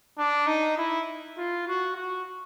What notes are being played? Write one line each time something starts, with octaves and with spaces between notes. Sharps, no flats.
D4
D#4
E4
F4
F#4
F#4